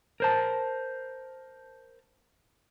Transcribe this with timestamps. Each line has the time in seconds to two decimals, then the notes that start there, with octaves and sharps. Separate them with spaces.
0.20 A#4 C5 A5